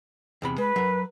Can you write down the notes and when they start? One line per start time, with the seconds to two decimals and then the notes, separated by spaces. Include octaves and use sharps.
0.42 E2 C3 B5
0.58 G#3 B4
0.76 F#3 A#4